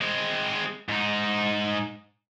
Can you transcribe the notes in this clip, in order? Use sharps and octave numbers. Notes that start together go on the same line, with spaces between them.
G#3 C4
G#2 D#4